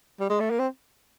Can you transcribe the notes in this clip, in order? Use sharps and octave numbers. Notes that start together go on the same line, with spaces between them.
G3
G#3
A3
A#3
C4